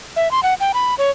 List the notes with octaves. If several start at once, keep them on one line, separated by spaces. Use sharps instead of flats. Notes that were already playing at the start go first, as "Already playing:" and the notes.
E5
C6
F#5
G5
B5
C#5